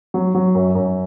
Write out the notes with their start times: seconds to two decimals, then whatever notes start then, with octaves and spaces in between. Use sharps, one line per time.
0.14 F#3
0.35 F#3
0.55 F#2
0.75 F#2